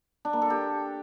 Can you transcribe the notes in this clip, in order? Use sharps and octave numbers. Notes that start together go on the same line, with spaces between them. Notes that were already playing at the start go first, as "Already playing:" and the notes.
D4
A#3
A4
G4